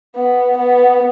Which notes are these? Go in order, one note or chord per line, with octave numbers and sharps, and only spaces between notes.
B3
B3